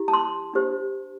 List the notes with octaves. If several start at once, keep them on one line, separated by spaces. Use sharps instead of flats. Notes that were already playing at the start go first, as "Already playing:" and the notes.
Already playing: E4 G4
A5
C6
D4 G4 C5